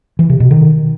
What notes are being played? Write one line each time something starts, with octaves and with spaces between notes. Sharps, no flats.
E3
C3
B2
D#3